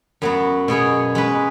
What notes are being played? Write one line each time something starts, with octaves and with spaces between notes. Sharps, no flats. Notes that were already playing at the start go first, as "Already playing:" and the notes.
F#2 F#3 B3
B2 B3 G#4 C#5
G#3 C#4 B4